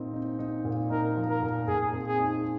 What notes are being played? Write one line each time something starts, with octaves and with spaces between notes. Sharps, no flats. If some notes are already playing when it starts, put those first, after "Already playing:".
Already playing: A#2 C4 D#4
D#4
D#4
A#2
D#4 A#4
F3
A#4
A#2
A#2 G#4
C4
G#4
D#4